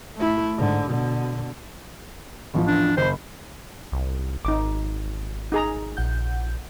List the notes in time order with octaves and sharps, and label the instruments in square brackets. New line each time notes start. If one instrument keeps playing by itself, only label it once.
[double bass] A3 E4
G#2 D3
B2 D3
[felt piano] A1 E2 F3
[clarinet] D4
[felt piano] F#1 B5 [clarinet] C5
[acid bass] C2
[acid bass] G#1 [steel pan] D#4 D6
[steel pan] D#4 G#4 A#5
[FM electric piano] A#1 F#5 G6